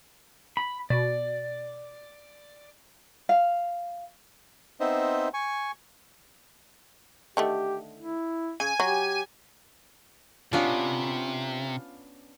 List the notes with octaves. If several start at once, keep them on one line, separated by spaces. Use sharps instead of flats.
B5
B2 D5
F5
B3 C4 D#4 C5 D#5 E5
G#5 C#6
D3 D#3 A3 G4
E4
C#3 G#5
F#3 G4
C3 B3 C#4 D4 F4 F5